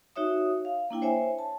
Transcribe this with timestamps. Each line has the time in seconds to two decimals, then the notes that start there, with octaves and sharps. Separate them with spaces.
0.16 D#4 F#4 C#5 E5 D#6
0.65 F5
0.91 A#3 D4 E4 G5
1.02 C5 C#5 E5 G#5
1.39 A5